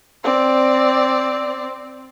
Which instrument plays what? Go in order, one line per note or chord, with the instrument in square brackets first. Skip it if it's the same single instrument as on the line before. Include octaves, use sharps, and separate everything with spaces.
[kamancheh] C4 D5